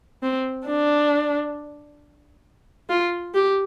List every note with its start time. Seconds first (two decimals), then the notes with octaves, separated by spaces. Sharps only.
0.23 C4
0.67 D4
2.90 F4
3.35 G4